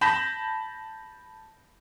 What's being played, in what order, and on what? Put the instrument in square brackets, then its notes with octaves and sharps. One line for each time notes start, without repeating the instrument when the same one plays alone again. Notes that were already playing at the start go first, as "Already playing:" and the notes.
[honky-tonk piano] A5 B5 G6 A#6 B6 E7